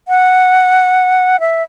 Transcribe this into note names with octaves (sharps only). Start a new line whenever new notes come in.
F#5
E5